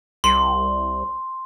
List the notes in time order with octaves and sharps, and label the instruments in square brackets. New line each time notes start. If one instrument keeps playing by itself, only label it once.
[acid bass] C2 [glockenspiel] C6